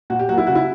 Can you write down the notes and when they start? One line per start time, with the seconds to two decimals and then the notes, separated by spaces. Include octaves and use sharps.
0.10 A#2 F#4
0.19 G4
0.29 F#3 A#3 F#4
0.38 E4
0.47 C#3 F#4
0.55 E4